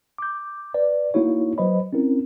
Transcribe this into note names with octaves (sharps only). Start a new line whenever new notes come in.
D6 G6
B4 D5
A#3 D#4 E4 F#4 C#5
F#3 B4 C5 D#5 B5
C4 C#4 E4 A#4